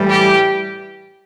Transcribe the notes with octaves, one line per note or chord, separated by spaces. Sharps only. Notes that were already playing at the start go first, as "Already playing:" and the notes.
Already playing: A2 E3 G3
G4